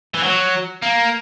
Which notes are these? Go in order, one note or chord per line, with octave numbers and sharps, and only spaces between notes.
E3
F#3
A#3